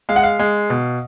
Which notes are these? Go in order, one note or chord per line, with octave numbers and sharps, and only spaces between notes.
G#3 F5
F#5
F5
G#3
B2